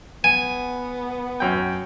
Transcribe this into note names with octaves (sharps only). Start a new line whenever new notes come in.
B3 G#5
F#2 G5